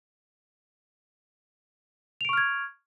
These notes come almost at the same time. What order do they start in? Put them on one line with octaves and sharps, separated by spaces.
F7 D7 C#6 F6 G#6